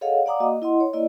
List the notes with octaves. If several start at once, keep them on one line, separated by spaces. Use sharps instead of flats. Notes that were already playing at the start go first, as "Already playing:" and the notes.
G#4 A4 C#5 D#5 F5 F#5
D5 F5 F#5 A#5 D6 D#6
A#3 F#4 D#5
E4 D#5 F#5 C6
C#5
A#3 E4 D5 D#5